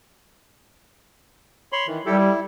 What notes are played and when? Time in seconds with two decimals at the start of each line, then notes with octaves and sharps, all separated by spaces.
1.72 C#5 B5 C6
1.87 D#3 E3
2.06 G3 E4 G4 A4
2.18 E4